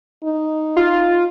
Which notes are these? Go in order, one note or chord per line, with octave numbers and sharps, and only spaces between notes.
D#4
F4